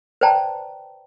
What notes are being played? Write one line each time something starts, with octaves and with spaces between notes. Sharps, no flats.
B4 C5 D5 G5 A5 A#5